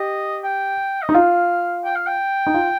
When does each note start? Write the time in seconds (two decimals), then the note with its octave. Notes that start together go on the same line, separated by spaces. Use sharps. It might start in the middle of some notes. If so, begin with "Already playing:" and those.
Already playing: G4 D#5
0.44 G5
1.02 D#5
1.09 D#4
1.14 F4 F5
1.84 G5
1.96 F5
2.07 G5
2.47 D#4
2.54 F4